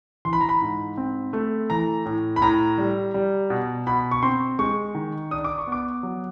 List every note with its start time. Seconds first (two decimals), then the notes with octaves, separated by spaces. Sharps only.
0.25 E3 C6
0.33 B5
0.41 A#5
0.49 B5
0.62 G#2
0.97 C4
1.33 A3
1.70 E3 A#5
2.06 A2
2.36 B5
2.42 A2 A#5
2.78 G3
3.14 G3
3.50 B2
3.87 B2 B5
4.11 C#6
4.23 C4 C6
4.59 G#3 C#6
4.95 D#3
5.31 D4 D#6
5.44 D6
5.58 C#6
5.67 B3
5.72 D6
6.03 F#3